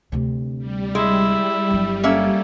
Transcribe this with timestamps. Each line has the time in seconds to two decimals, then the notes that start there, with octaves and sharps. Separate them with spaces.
0.12 D2 C3
0.58 G3
0.95 G#3 E4 E5
1.71 G1 F#3
2.03 A#3 C#4 A4 E5